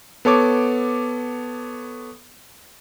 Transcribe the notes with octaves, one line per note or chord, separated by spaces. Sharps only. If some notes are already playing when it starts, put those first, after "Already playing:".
B3 A4 C#5 D6